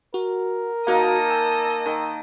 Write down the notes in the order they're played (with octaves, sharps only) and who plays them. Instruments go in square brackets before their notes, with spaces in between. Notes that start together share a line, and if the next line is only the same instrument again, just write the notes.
[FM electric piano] F#4 [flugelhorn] A#4
[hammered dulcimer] A#3 D#4 [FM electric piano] F#4 F#5 [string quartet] D#5 A5
[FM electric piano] G#5 E6
[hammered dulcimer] D#3